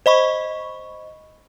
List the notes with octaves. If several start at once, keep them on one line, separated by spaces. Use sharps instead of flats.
C5 D#5 B5 C#6